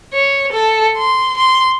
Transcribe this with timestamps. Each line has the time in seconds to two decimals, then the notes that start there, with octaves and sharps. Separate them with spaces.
0.13 C#5
0.52 A4
0.98 C6
1.37 C6